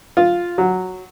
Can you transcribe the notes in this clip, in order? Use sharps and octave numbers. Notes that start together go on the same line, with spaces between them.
F4
F#3